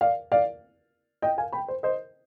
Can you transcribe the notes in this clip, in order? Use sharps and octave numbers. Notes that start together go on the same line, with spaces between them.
D5 F5
D5 F5
D#5 G5
F5 G#5
G5 B5
C5
C5 D#5